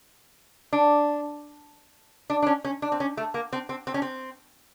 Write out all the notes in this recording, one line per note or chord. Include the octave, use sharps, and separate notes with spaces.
D4
D4
D4
C#4
C#4
D4
C4
C#4
A3
A#3
C4
C4
C4
C#4
C4